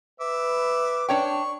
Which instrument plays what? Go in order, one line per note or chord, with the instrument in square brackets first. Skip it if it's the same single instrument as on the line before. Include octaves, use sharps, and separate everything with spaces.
[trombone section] B4 [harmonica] E5 D6
[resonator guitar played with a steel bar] D4 C#5 G5 [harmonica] C#6